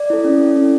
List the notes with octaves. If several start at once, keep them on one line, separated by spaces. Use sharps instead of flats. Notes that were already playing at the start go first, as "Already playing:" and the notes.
Already playing: D5
E4 A4
C#4
E4 A4
C#4